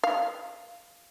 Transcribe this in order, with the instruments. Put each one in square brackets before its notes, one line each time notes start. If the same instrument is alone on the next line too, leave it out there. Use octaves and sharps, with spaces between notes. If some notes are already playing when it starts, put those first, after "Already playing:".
[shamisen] F5